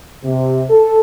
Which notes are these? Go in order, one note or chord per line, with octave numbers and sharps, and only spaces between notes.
C3
A4